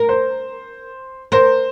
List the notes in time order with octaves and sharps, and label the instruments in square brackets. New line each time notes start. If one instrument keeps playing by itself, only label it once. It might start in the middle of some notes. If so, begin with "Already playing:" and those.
Already playing: [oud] A#4
[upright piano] C5
[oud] A#4 [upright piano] C5